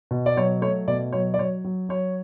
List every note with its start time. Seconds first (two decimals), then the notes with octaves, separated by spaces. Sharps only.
0.11 B2
0.26 D5
0.36 F#3 C#5
0.62 A3 C#5
0.88 B2 D5
1.13 F#3 C#5
1.34 D5
1.38 F#3 C#5
1.64 F#3
1.89 F#3 C#5